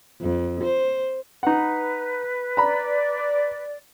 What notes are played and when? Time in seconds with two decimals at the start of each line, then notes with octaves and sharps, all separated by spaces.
0.21 F2
0.63 C5
1.43 D#4 B4 F#5
2.57 D5 A#5 B5